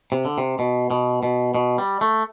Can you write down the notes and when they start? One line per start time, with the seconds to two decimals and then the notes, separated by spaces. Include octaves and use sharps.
0.12 C3
0.25 D3
0.38 C3
0.59 B2
0.91 B2
1.23 B2
1.55 B2
1.78 G3
2.01 A3